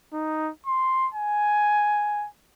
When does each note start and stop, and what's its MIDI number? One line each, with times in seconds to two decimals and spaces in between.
0.14 0.50 63
0.67 1.08 84
1.14 2.27 80